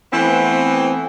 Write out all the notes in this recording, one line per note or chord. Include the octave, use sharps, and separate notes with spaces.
E3 A3 B3 C4